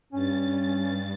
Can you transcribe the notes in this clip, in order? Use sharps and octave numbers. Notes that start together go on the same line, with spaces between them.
G2 C#4 A6